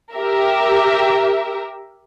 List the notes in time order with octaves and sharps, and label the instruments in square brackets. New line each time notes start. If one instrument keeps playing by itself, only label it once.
[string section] G4 A#4 E5